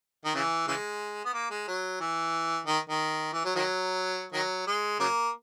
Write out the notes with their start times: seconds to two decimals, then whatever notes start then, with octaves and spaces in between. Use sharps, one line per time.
0.25 D#3
0.34 C#3 E3
0.68 C#3 E3 G#3
1.25 B3
1.34 A#3
1.50 G#3
1.68 F#3
2.01 E3
2.67 D#3
2.90 D#3
3.33 E3
3.45 F#3
3.56 D#3 F#3
4.33 D#3 F#3
4.67 G#3
5.00 C#3 F#3 A#3